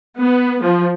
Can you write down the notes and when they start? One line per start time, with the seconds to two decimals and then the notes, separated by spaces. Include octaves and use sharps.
0.19 B3
0.63 F3